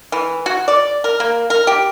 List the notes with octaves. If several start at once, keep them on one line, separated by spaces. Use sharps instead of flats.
E3
F#4
D5
A#4
A#3
A#4
G4